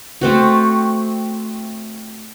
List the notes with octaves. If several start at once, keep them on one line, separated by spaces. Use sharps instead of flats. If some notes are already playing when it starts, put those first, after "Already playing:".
A3 C4 F#4